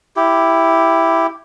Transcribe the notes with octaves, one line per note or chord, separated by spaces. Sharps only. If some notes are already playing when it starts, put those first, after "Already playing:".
E4 G4